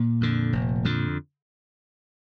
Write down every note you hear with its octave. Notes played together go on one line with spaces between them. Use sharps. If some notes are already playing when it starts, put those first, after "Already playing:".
Already playing: A#2 A#3
F2 D3
F1
F2 D3